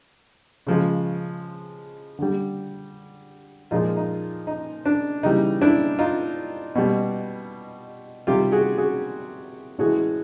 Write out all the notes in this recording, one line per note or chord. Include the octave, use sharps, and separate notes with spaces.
C#3 F3 G#3
D3 G3
A#2 F3 G#3 D#4 F4
D#4
D#4
D4
C#3 E3 G3 D#4
D4 E4
D#4 F4
B2 G3
C3 D#3 G3 F4 G4
F#4 G#4
F#4 G#4
A2 E3 G#3 F#4 G#4